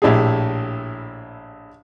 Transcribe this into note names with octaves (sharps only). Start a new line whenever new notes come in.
A#1 A2 E4 G4 G#4